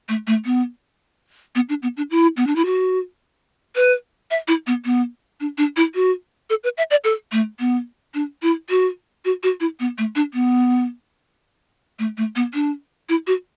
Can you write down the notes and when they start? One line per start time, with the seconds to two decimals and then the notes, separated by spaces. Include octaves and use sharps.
0.09 A3
0.27 A3
0.45 B3
1.55 B3
1.69 D4
1.82 B3
1.97 D4
2.11 E4
2.37 B3
2.47 D4
2.56 E4
2.66 F#4
3.76 B4
4.31 E5
4.48 E4
4.67 B3
4.85 B3
5.40 D4
5.58 D4
5.77 E4
5.95 F#4
6.50 A4
6.64 B4
6.78 E5
6.91 D5
7.04 A4
7.32 A3
7.60 B3
8.14 D4
8.42 E4
8.70 F#4
9.25 F#4
9.43 F#4
9.60 E4
9.80 B3
9.98 A3
10.16 D4
10.34 B3
11.99 A3
12.18 A3
12.36 B3
12.54 D4
13.09 E4
13.27 F#4